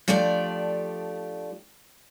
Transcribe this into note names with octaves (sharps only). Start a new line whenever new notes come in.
F3 A3 D4 G4 D5